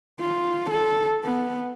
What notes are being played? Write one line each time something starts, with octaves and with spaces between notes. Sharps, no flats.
F4
A4
B3